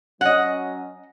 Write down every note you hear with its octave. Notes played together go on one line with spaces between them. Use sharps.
F#3 C#4 D#5 F#5